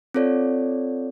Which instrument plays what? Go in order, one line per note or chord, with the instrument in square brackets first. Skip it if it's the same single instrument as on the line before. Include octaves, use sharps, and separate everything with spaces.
[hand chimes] C4 F4 A4 C#5 D5